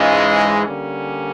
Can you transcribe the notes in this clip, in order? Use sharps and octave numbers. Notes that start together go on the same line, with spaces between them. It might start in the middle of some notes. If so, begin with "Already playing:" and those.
Already playing: G#2 E3 G#3 C#4 F4
D3 G3 A#3 C#4